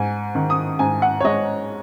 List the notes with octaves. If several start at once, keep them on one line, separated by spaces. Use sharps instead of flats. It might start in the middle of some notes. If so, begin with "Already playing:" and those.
Already playing: G#2 G#5
D#3
D#6
G#2 G#5
F#5
C#5
G#3 D#5